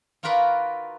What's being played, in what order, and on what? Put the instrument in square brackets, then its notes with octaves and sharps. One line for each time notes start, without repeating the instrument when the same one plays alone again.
[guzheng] D#4 F4 F#4 A#4 B4 D5